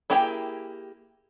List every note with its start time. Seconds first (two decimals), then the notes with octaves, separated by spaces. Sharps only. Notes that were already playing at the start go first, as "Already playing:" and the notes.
0.10 A#3 E4 G4 G#4 G5